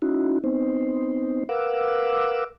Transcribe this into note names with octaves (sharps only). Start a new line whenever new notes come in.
C#4 D#4 E4 F#4
B3 C4 D#4 C5
A#4 B4 F5 F#5 D6 E6